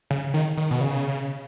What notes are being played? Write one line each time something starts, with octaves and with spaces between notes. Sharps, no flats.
C#3
D#3
D#3
B2
C#3